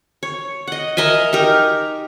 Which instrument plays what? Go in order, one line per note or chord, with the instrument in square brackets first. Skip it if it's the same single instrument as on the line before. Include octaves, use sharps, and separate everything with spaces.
[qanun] C#5
D#5 F#5
A#4 D#5 E5 G#5
D#4 G4 A#4